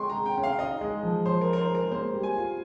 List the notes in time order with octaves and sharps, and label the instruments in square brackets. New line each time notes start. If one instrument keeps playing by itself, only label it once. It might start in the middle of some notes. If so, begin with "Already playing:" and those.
Already playing: [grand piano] G#3 [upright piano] G5 C6 C#6
[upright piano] A#5
[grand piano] G#4
[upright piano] G5
[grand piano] C#4
[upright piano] F5
[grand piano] D#4 [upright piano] D#5
[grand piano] G#3
F3
[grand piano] F3 [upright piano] C5
[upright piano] A#4
[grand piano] D#4
[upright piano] A#4
C5
[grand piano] G#3
[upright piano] A#4
[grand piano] A#3 [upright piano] C5
[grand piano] G3
[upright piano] G#5
[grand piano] F4